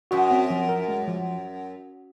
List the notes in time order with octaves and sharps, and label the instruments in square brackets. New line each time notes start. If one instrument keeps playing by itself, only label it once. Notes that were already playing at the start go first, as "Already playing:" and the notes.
[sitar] F#2 [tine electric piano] F#4
[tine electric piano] C4
F3
A#4
G#3
F3